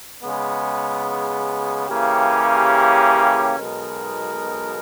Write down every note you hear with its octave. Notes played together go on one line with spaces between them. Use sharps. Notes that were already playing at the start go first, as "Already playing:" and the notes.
C#3 G#3 B3
C#3 E3 A#3 C#4 G4
B1 B2 G#3 D#4 A#4